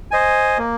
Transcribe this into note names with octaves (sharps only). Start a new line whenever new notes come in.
C5 D#5 G#5
A#3